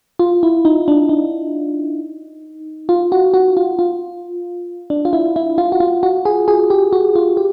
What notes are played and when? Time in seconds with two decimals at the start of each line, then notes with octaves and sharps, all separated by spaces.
0.19 F4
0.43 E4
0.65 D#4
0.88 D4
1.09 D#4
2.89 F4
3.12 F#4
3.34 F#4
3.57 F4
3.79 F4
4.90 D4
5.05 F4
5.13 E4
5.36 E4
5.58 F4
5.72 F#4
5.80 F4
6.03 F#4
6.25 G#4
6.48 G#4
6.70 G4
6.93 F#4
7.16 F4
7.37 G4